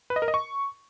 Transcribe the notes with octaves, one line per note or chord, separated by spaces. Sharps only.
B4
D#5
A#4
D#5
C#6